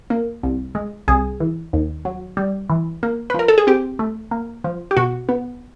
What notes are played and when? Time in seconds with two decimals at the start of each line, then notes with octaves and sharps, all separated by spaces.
0.10 A#3
0.43 C2
0.75 G#3
1.08 C2 G#4
1.40 E3
1.73 D#2
2.05 F#3
2.37 G3
2.70 E3
3.03 A#3
3.30 B4
3.34 F3 A#4
3.48 A4
3.58 G#4
3.67 C4 G4
3.99 A3
4.31 A#3
4.64 F3
4.91 G4
4.97 B2 F#4
5.29 B3